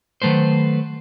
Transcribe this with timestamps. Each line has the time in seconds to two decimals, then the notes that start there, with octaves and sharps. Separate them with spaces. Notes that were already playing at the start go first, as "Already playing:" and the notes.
0.22 D#3 F#3 A3 B4 C5